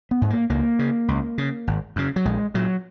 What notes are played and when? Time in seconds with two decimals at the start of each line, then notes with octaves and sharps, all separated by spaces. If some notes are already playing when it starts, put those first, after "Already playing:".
0.11 B3
0.21 G#2
0.30 A#3
0.50 C#2 A#3
0.79 C#3
1.08 C#2
1.38 C#3
1.67 G#1
1.96 F#2 C#3
2.16 F#3
2.25 A#1 G#3
2.54 A#2 F#3